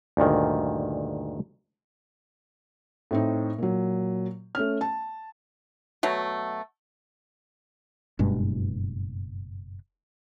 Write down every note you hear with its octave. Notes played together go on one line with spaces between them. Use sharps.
D2 G2 A#2 D#3
A2 C4 D#4
A#2 F#3
A3 C#4 F6
A5
B2 F#3 A3
F#1 G2 B2 G#3